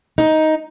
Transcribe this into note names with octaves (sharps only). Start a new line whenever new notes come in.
D#4